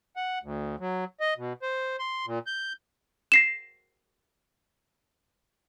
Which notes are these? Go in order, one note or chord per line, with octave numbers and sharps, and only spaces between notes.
F#5
D2
F#3
D#5
B2
C5
C6
A#2
G6
A#6 C7 E7